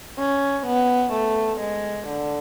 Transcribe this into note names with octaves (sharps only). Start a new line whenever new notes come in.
C#4
B3
A3
G#3
D3